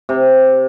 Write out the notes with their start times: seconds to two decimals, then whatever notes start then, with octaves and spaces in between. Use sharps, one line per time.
0.09 C3